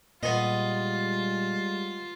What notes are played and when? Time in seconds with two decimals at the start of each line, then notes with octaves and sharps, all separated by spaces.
0.23 A#2 G3 G#3 B3 F4 D#5